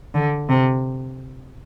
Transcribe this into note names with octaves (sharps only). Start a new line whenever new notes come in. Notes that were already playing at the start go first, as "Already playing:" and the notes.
D3
C3